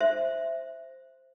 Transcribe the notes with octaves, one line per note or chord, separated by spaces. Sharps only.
C5 E5